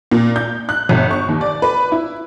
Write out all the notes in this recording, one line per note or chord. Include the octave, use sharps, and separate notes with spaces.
A#2
G6
F#6
G1
C#6
D#2
D5
B4
E4